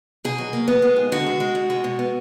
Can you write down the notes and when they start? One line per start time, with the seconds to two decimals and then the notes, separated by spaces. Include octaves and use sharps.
0.24 B2 G#4
0.38 F#3
0.53 A#3
0.68 B3
0.82 G#3
0.96 D#3
1.12 D3 F#4
1.26 G#3
1.40 G#3
1.55 B2
1.70 G#3
1.84 B2
1.99 B3